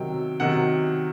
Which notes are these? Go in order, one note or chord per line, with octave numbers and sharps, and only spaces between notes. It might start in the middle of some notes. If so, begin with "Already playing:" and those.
Already playing: C3 D#3 F#3 G5
C3 D#3 F#3 F#5